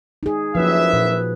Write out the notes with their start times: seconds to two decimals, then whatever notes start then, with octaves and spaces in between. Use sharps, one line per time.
0.23 D#4 G#4
0.55 F#1 F3 F#4 B4 E5
0.93 A#2